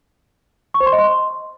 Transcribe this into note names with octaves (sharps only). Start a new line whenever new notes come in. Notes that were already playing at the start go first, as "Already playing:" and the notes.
C#6
C5
C6
D#5
C6